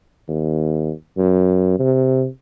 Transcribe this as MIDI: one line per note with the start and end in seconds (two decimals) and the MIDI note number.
0.28 0.92 39
1.17 1.75 42
1.79 2.27 48